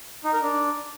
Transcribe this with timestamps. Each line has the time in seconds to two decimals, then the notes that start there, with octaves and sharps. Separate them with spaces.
0.25 D#4
0.33 A#4
0.42 D4